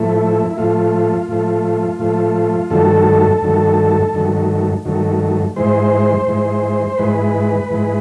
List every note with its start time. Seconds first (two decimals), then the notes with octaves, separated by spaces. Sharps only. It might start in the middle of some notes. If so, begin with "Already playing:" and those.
Already playing: A2 F3 A3 E4
0.50 E4
0.58 A2 F3 A3 F4
1.28 A2 F3 A3
1.99 A2 F3 A3
2.70 G2 D#3 F#3 A3 A4
3.42 G2 D#3 F#3 A3
4.13 G2 D#3 F#3 A3
4.85 G2 D#3 F#3 A3
5.56 G#2 E3 G#3 C5
6.27 G#2 E3 G#3
6.98 G#2 E3 G#3 B4
7.70 G#2 E3 G#3